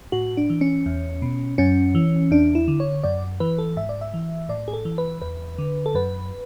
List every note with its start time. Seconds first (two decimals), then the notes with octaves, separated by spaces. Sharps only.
0.12 A2 F#4
0.37 D4
0.50 E3
0.61 C#4
0.86 E2
1.22 B2
1.58 F#2 C#4
1.95 E3
2.31 E2 D4
2.55 E4
2.68 D3
2.80 C#5
3.04 F#2 D5
3.40 E3 B4
3.58 A4
3.77 G#2 E5
3.89 D5
4.01 E5
4.14 E3
4.49 A2 D5
4.68 G#4
4.73 A4
4.85 E3
4.98 B4
5.22 E2 B4
5.58 D3
5.86 A4
5.95 F#2 B4